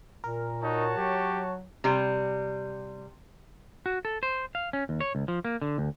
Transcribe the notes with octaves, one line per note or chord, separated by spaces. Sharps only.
A#2 A#4
D#4 F#4 C#5 A5
F#3 G4
C3 G3
F#4
A4
C5
F5
C#4
D#2
C#5
C#2
F3
A#3
D3
D2